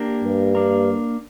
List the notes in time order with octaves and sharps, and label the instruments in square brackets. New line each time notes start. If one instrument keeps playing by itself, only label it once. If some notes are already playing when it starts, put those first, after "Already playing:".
Already playing: [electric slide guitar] A#3 D4 G4 A#4
[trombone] G2
[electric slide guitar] A#3 D4 A#4